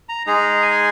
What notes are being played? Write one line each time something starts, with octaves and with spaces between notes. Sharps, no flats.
A#5
G#3 D#4 G#4 A#5
G#5